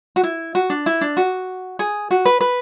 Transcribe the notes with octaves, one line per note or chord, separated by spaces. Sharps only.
F#4
E4
F#4
D4
E4
D4
F#4
G#4
F#4
B4
B4